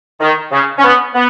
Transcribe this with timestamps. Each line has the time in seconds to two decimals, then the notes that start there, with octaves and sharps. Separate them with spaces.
0.20 D#3
0.51 C#3
0.78 C#4
0.83 B3
1.15 B3